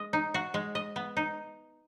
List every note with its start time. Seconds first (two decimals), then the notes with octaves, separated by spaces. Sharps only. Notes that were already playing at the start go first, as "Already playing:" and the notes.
Already playing: G#3 D#5
0.13 D#4
0.34 F#4
0.54 G#3
0.75 D#5
0.96 B3
1.17 D#4